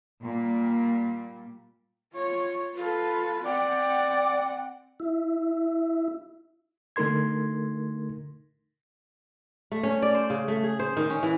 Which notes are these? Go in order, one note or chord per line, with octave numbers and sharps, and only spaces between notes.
A#2 G3
F4 C#5
F4 A4 B4
C4 D5 F#5 G5
E4
D3 A3 D#4 A#4 C6 G#6
A3
C#4
D5
C5
C#3
A3
G#4
C5
D#3
C#4
E3